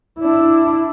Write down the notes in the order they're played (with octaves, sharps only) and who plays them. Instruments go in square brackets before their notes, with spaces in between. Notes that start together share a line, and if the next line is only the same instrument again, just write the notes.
[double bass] D4 E4